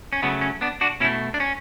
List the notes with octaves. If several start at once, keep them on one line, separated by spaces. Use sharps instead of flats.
C#4
C#3 F#3 A3 B3
C#4
B3 D4
D4 F#4
B2 A3 C#4 E4
D4
C#4